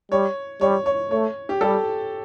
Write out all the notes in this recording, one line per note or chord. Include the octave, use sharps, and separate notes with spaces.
G3 C#5
G3 C#5
C#5
A3 C#5
G4
G3 A4